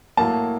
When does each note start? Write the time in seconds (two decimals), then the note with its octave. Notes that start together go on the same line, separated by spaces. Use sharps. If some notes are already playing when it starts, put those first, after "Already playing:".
0.17 A2 F#3 A#3 A5